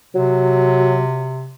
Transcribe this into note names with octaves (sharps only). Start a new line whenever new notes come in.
C3 F#3